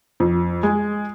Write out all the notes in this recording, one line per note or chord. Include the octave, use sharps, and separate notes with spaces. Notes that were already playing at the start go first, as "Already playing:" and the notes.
F2
G#3